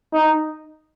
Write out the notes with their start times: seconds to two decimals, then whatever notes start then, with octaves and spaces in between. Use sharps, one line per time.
0.13 D#4